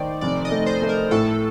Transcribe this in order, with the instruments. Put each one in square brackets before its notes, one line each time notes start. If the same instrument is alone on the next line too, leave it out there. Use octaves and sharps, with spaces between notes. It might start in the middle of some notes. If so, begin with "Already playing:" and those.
Already playing: [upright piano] D#3 [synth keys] D#4 C5 D5
[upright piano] F1 [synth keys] D5
[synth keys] D#5
[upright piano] A3
[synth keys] C5
[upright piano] A3
[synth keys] A#4
[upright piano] A2 [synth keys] A4